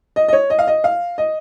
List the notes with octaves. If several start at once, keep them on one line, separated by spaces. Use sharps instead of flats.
D#5
D#5
C#5
D#5
F5
D#5
F5
D#5